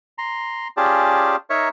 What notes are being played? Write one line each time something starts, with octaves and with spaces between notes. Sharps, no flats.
A#5 C6
C#4 F4 G4 G#4 D5 A5
D#4 A#4 C#5 E5